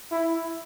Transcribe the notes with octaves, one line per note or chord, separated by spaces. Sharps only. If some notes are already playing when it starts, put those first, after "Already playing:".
E4